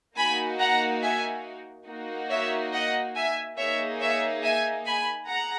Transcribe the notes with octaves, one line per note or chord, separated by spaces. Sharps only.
A#3 D#4 F#4 G#5 B5
F#5 A#5
E5 G#5
A#3 D#4 F#4
C#5 E5
D#5 F#5
E5 G#5
A#3 D#4 G#4 C#5 E5
C#5 E5
E5 G#5
G#5 B5
G#4 F#5 A#5